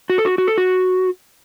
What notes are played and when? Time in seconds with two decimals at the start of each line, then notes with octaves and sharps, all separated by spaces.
0.10 F#4
0.18 A4
0.25 F#4
0.38 F#4
0.47 A4
0.58 F#4